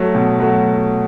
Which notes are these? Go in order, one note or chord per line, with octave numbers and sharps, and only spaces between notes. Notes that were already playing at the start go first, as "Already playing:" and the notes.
Already playing: F#3 A3
B2
F#3 A3